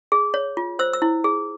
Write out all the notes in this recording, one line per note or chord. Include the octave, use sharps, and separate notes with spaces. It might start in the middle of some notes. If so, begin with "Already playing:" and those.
G#4
C#5
F4
C5 E6
E6
E4
G#4